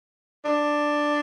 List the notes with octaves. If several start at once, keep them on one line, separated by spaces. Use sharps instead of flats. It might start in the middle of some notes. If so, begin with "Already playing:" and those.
D4